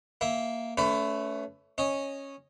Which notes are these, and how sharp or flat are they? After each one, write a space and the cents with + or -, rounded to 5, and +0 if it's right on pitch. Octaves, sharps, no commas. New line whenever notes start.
A#3 +0 E5 +0
A3 +0 C#4 +30 B4 +25
C#4 -10 D#5 +0